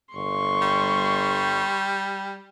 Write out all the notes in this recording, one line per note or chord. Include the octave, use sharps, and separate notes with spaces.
G1 C6 C#6
G3